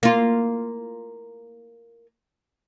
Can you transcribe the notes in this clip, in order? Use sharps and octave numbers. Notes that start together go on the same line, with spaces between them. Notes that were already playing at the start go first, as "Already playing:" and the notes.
A#3 F4